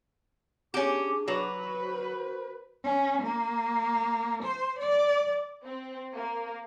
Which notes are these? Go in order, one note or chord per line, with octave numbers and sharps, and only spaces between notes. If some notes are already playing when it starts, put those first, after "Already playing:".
C#4 D4 G4 G#4 D6
F#3 B4
F#4 A#4 C5
C#4
A#3
C5
D5
C4
A#3